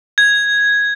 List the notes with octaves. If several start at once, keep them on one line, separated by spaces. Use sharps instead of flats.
G#6